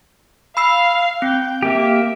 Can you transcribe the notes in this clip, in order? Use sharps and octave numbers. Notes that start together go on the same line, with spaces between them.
F5 B5 E6 C7
C4 G5
A#3 G4 E5